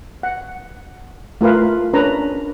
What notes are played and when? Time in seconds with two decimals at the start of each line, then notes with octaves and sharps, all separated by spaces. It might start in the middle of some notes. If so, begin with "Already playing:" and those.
0.23 F#5
1.41 A3 F4 A#4 B4 F5
1.93 C#4 D4 A#4 B4 A#5